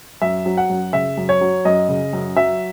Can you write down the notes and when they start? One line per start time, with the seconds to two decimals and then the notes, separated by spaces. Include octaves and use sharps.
0.22 F#2 E5
0.46 F#3
0.57 F#5
0.70 F#2
0.93 C#3 E5
1.17 F#2
1.29 C#5
1.41 F#3
1.65 F#2 D#5
1.89 C#3
2.13 F#2
2.36 F#3 E5